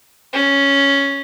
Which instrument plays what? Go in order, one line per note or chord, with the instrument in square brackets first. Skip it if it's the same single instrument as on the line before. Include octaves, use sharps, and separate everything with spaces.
[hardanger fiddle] C#4